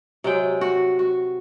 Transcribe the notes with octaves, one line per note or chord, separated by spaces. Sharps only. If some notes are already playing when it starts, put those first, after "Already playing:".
C3 F#3 G#3 G5
F#4
F#4